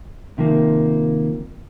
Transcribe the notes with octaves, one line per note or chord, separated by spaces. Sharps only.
C3 D#3 F3 A#3